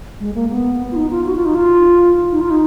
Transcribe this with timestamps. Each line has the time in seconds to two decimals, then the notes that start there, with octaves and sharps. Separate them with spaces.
0.21 G#3
0.35 A#3
0.51 B3
0.92 F4
0.96 D#4
1.11 F4
1.26 F#4
1.36 F4
1.45 D#4
1.55 F4
2.32 D#4
2.41 F4
2.50 D#4